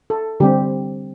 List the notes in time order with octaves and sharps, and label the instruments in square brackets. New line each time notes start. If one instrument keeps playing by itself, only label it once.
[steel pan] A4
D3 G3 C4 G4